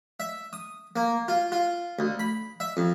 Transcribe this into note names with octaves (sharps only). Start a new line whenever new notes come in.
E5
D#6
A#3
F4
F4
D2
B5
E5
F2